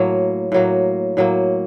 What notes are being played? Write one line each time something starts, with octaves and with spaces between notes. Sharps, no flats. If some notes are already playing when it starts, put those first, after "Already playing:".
Already playing: A2 F#3 A#3
A2 F#3 A#3
A2 F#3 A#3